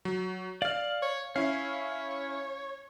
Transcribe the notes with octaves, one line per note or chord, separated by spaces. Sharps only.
F#3
D5 F5 F6
C#5
C#4 E4 C#5 F5